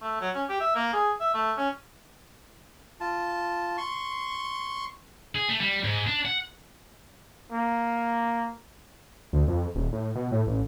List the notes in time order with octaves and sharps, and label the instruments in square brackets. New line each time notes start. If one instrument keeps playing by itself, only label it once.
[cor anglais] A3
F#3
C#4
G4
E5
A#3
G#4
E5
A3
C#4
[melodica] F4 A5
C6 C#6
[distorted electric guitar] G#4
A3
G3
G#2
D4
F#5
[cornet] A#3
[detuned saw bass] D2
F2
D#1
A2
B2
A2
A1